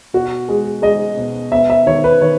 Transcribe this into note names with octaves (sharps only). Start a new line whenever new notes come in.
B2 F#4
G#3
G#3 D#5
B2
B3 E5
E5
D#3 C#5
B4
D#3 C#5